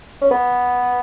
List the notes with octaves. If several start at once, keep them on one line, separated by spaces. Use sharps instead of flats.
C#4
B3